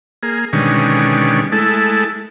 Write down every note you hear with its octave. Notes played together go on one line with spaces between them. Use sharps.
A#3 G#4
B2 D3 D#3 G3 G#3 C#4
G#3 A3 E4 A4